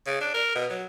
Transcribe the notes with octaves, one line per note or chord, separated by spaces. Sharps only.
C#3
D4
A#4
B2
F#3